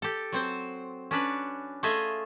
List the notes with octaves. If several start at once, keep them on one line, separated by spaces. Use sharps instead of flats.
G4 A4
F#3 C4 C5
C#4 D4 B4
A3 F4 G#4 D#5 E5 G#5